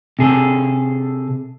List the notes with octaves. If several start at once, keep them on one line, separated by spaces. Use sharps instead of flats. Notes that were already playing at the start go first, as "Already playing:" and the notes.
C3 G#4 A4